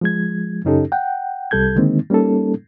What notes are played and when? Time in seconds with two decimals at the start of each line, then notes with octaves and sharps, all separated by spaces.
0.01 F3 G#3 G#6
0.65 F#2 C#3 C#4 D#4 G4 A4
0.92 F#5 G5
1.51 C2 C3 G3 A4 G6 G#6
1.76 D3 D#3 G#3 A#3 C4 D#4
2.10 G3 A#3 C#4 D#4 A4